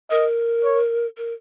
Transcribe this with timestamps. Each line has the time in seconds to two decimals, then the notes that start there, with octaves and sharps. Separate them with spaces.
0.10 A#4 D#5
0.64 C#5
1.17 A#4